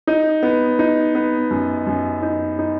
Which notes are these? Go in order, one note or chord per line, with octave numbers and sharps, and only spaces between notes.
D#4
B3
D#4
B3
F#2
F#2
D#4
D#4